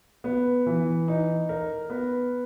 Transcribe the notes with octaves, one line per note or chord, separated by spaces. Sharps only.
B3
E3
D#4
A#4
B3